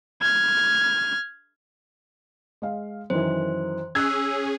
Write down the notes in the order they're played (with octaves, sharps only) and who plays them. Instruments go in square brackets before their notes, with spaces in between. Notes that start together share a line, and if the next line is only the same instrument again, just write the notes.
[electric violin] F6 G#6
[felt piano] G#3 F5
[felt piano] F#2 D#3 E3 [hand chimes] C5
[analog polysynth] C#4 G#4 [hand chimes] E6 [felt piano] F#6 G#6